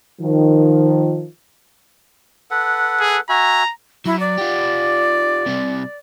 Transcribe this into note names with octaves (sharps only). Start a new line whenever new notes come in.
D#3 F3
A4 B4 F#5
G#4
F#4 E5 G#5 A#5
F#3 E4
D5
F4 G4
C3 G3